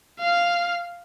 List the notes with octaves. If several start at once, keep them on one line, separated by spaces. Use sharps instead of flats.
F5